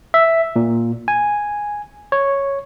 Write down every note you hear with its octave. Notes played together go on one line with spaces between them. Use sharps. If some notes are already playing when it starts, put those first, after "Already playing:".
E5
A#2
G#5
C#5